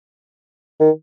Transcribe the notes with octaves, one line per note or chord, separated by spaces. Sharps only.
D#3